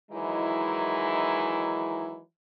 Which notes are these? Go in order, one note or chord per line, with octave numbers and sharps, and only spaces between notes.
D#3 E3 F#3 G#3 D#4 E4